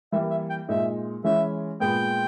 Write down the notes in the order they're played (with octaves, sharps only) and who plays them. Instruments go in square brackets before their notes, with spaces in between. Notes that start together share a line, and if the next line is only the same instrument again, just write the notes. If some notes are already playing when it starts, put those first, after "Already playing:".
[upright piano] E3 G3 A#3 [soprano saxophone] E5
[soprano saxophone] E5
G5
[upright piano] A#2 G#3 D#4 [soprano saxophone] E5
[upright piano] E3 G#3 C#4 E4 [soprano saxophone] E5
[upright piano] A#2 G#3 B3 [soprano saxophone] G5